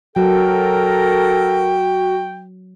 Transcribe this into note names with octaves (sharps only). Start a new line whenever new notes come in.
F#3 F#4 A4 A#4 G5